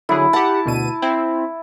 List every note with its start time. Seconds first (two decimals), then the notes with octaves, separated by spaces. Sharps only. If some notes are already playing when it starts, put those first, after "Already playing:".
0.09 D3 F#3 E4 G#4
0.33 G4 F#5 A5
0.66 D2 B2 D#7
1.02 C4 E4